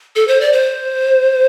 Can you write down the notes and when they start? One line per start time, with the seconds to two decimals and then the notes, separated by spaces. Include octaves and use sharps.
0.16 A4
0.28 C5
0.41 D5
0.52 C5